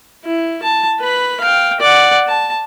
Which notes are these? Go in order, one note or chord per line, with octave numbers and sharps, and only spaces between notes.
E4
A5
B4 B5
F5 G5
D5 F#5
A5